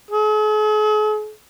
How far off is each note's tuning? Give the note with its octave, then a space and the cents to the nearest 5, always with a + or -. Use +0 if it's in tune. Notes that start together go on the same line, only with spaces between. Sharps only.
G#4 +45